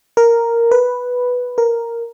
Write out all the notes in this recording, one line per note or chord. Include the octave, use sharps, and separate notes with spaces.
A#4
B4
A#4